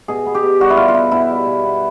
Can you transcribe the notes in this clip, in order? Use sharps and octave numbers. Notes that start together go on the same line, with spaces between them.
B2 G#4
B3
G4
B2
G3 F#4
E4
B2 F4
F4
B3 E4
B2 E4
G3
B2
B3